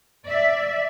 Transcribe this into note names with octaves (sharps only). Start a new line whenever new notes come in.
D5 E5